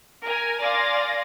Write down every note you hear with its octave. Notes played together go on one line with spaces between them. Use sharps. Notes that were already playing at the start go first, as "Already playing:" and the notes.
A#4 G#5
D5 F5 G#5 C6 A6 A#6